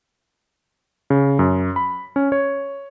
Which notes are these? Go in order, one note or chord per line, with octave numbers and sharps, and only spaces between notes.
C#3
F#2
B5
C#4
C#5